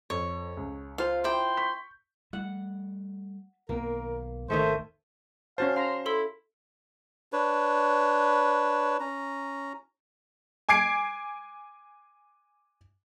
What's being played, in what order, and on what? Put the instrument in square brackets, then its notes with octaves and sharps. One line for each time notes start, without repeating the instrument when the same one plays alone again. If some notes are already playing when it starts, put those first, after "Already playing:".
[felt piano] F2 [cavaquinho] C#5
[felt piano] C#2
[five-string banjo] F4 C5 [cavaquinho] F5
[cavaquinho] E4 G5 [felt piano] A#5 D6 [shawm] C6
[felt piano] C#6 G6 B6
[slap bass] G3 A3 [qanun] F#5
[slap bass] B1 D#3 B3 [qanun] A#3 [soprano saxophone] A#4
[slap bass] G#1 D#2 C3 [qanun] D#3 D#5 C#6 [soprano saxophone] A3 [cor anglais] C5
[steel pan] C#4 F#4 A5 [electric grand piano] C5 [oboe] F5
[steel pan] F5 A#5 [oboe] C6 [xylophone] F6
[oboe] E4 [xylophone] A4 C6 E6
[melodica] D4 B4 C#5
C#4 A#5
[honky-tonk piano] G#5 D6 G#6 C7 D7